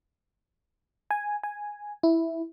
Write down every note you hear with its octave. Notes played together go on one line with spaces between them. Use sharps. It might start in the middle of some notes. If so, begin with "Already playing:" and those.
G#5
G#5
E4